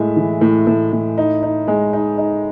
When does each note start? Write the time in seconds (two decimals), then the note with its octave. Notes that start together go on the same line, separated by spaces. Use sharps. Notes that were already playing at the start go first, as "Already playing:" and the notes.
Already playing: A2 G#3 E5
0.16 E3
0.41 A2
0.67 A2
0.92 A2
1.18 D#4
1.43 D#4
1.68 G#3
1.93 D#4
2.18 D#4